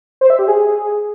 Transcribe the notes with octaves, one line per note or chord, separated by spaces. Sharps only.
C5
E5
G4
G#4